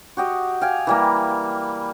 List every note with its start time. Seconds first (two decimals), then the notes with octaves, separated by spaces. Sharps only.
0.17 F#4 G4 D#5
0.61 F5 G5 G#5
0.87 E3 G3 A#3